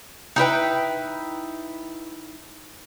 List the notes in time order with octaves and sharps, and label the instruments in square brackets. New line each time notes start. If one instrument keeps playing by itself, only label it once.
[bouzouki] D#4 E4 B4 G5